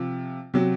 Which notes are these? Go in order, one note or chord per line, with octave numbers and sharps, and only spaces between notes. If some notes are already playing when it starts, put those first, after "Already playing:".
Already playing: C3 F3
C3 F#3